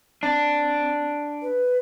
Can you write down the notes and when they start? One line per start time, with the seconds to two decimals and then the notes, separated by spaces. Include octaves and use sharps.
0.23 C4 D4
1.42 B4